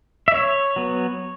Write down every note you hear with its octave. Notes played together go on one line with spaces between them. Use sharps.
E5
C#5
F#3 B3